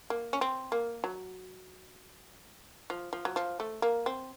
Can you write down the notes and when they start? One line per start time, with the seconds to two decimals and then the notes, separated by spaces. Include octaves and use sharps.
0.10 A#3
0.33 C#4
0.41 C4
0.72 A#3
1.04 F#3
2.90 F3
3.13 F3
3.25 F#3
3.36 F3
3.60 A3
3.82 A#3
4.06 C4